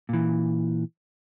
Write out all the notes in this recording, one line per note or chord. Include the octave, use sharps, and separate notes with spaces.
A#2 E3